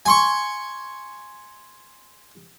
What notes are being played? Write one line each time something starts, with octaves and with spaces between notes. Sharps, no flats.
G#5 C6 C#6